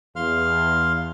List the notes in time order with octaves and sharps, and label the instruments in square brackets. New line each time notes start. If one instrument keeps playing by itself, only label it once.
[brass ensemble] E2 [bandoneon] F5 C6 F6